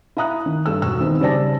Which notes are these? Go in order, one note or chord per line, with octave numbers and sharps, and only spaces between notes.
E4 F5 A#5 D#6 F#6
D#3
G2 A4 E6
E1 F#4 E6
D#3 E3 B3 C4 D#4
C#3 G3 C5 D5 A5 A#6